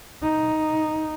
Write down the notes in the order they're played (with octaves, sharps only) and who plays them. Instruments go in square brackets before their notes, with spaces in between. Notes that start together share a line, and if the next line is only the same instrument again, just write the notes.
[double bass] D#4